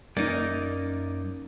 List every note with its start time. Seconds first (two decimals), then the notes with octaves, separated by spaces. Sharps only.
0.17 F#2 A#3 D#4 A#4 D5